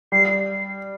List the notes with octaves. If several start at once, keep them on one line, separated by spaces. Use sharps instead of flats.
G3 C7